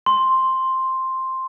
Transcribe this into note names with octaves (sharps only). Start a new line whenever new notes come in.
C6